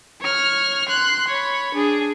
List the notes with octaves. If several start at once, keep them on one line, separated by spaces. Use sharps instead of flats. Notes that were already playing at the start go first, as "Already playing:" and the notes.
C#5 F6
C6 F#6
C#5 B5
D4 G#4